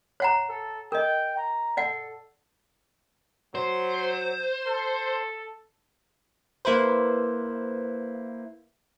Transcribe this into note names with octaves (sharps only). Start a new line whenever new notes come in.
C#5 F#5 A#5
A4
A#4 D#5 G5
A#5
A4 D5 F#5
F#3 C5
A4
A#3 E4 B4 C5